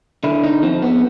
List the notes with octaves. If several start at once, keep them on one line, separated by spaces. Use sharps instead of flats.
D3 E4
D#4
F3 C4
B3